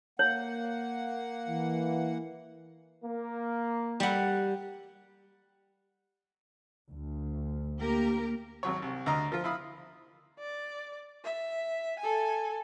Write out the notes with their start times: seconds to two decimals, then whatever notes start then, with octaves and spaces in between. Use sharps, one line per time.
0.19 A#3 C#5 F#5
1.48 E3
3.03 A#3
4.00 G3 F#5
6.91 D2
7.80 A#3 G4 A#4
8.63 G#1 F#3 C#5
8.82 C2
9.06 D2 D#5 A#5 D#6 F6
9.32 F3 F4
9.44 E4 F5 B5 D#6
10.39 D5
11.25 E5
11.99 A4 G#5